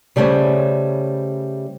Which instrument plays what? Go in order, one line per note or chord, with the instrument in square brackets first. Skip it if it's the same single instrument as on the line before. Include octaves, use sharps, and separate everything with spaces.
[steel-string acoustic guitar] C#3 G3 A3 A#3 C#4 C5